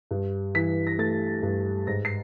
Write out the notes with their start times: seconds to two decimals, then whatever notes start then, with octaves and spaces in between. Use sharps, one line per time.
0.11 G2
0.54 E3 B6
0.87 A#6
0.98 A3 A6
1.43 G2
1.87 G#2 A#6
2.05 C7